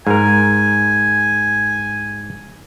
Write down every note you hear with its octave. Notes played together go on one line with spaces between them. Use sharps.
G#2 A#4 G#5